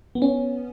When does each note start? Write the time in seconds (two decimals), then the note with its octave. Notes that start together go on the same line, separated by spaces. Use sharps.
0.15 B3
0.22 C#4